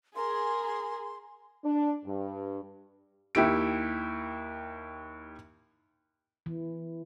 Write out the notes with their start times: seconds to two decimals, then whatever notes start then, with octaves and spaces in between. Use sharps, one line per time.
0.16 G#4 A#4 C6
1.64 D4
2.04 G2
3.35 D#2 E4 G4 D7
6.46 E3